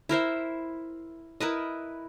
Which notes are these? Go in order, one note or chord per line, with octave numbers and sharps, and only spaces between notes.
E4 A#4 C5 E5
E4 A#4 B4 D#5